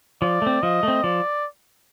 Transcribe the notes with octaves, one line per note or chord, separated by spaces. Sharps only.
F3 D5
A3 C4
F3 D#5
A3 C4
F3 D5